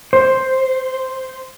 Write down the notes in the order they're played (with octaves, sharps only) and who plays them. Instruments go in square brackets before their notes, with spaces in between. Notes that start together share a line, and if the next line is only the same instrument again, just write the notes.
[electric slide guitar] C5